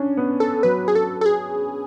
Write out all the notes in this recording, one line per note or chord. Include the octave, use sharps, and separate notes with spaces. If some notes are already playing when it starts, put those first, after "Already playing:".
Already playing: C#4 D4
B3
A4
F#3 B4
G#4
A4
A4
G#4